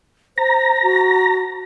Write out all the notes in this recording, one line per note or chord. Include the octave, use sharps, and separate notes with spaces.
C5 A#5
F#4